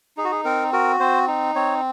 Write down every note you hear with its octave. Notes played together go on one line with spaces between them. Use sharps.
D#4 G#4
F#4
G#4
C4 A#4
F#4 A#4
C4 C5
D#4
C4 C#5